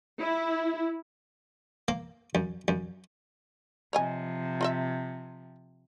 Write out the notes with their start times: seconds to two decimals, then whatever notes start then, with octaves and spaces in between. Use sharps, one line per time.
0.20 E4
1.88 A#3
2.35 F#2
2.68 F#2
3.93 C3 F3 C#5 D#5 G#5
4.61 F4 D#5 E5